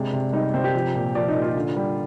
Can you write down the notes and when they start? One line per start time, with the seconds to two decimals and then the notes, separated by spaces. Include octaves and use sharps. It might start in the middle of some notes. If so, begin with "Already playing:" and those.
Already playing: C3 G#3 D4
0.13 C3
0.33 G3 D#4
0.54 C3 C4
0.64 G4
0.74 F3
0.95 A#2
1.14 F3 D5
1.28 D#4
1.35 A#2
1.42 F4
1.56 D3
1.76 G3